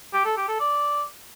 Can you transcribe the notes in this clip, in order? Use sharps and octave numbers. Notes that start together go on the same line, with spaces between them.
G4
A4
G4
A4
D5